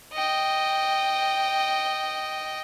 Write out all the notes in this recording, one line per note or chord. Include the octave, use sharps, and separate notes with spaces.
D#5 G5